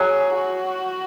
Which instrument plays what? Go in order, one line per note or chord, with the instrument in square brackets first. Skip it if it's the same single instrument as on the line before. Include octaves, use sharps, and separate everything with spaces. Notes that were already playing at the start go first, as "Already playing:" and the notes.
Already playing: [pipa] F#3 [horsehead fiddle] G#4
[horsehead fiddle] F#4